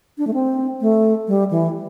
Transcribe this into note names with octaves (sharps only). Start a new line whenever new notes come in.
D4
A3
C4
A3
G3
E3